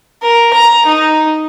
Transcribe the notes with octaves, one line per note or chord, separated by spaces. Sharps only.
A#4
A#5
D#4